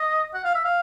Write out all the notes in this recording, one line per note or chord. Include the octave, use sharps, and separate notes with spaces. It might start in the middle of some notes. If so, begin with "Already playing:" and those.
Already playing: D#5
F#5
F5
E5
F5